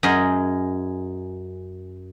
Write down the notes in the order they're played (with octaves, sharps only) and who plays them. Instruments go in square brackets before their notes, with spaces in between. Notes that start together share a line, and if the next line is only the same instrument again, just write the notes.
[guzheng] F#2 G#4 D#5